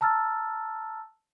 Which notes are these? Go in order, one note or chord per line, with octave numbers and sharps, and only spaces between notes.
A5 A#5 E6 F6 A6